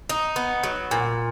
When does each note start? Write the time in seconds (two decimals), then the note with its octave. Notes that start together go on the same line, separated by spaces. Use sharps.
0.09 D#4
0.36 B3
0.63 F#3
0.91 A#2